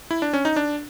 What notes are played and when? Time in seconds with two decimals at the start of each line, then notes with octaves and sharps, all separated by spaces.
0.11 E4
0.22 D4
0.33 C#4
0.45 D#4
0.56 D4